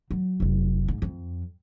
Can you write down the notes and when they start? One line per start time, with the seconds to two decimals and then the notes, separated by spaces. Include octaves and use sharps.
0.11 F#3
0.40 F1 F#3
0.88 G#2
1.02 F2